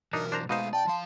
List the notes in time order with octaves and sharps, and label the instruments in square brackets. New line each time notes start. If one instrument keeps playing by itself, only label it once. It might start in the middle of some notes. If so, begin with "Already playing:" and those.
[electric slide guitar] B2 E3 F#3 [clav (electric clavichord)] D4 D#4 [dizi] A#4
[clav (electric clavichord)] D4 C5 A#5
[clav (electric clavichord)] B2 D#4 C5 [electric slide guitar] G#3 A3 [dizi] F5 [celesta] D#7
[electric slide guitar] D5 [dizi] G5 [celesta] A5
[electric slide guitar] F3 F5 [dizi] C6